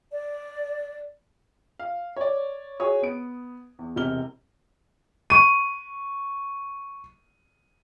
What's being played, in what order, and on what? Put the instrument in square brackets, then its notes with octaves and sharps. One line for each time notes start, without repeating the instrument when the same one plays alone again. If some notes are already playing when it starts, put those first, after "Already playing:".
[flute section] D5
[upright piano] F5
C#5 D5
F#4 G#4 C#5 D#6
B3 D7
E2
E1 C3 F6 G7
[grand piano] C#6 D#7